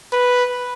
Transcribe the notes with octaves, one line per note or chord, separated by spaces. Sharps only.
B4